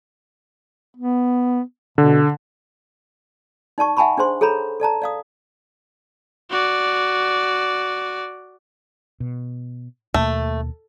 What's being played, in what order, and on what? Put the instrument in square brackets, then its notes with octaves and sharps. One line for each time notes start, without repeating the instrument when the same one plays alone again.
[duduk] B3
[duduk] B2 [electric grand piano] D3
[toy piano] D#4 D5 A5 C#6
E5 F#5 G#5 A5 B5 C#6
D4 G#4 C5 C6
G#4 A4 C#5 A#5 B5
A4 D5 A5 A#5
D5 F5 D#6
[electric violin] F#4 D5
[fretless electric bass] B2
[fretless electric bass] D#2 B2 A#3 [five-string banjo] A3